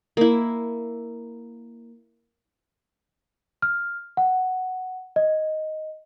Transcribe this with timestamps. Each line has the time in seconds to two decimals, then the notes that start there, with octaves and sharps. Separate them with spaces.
0.17 A#3 E4
3.62 F6
4.17 F#5
5.16 D#5